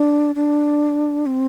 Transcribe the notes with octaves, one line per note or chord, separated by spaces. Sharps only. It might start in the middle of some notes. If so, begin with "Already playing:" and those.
Already playing: D4
D4
C4